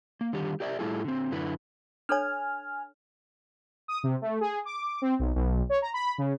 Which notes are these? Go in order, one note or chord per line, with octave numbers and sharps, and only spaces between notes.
A#3
D3 D#3 G3 G4
G4 A#4 D5 E5
A2 G3 E4 F4 G#4 A4
D3 C4
F#2 D3 E4 B4
D4 A4 C#5 G#5 F6
D#6
C3
A3
G#4
D6
C4
B1
B1
C#5
A#5
B5
C#3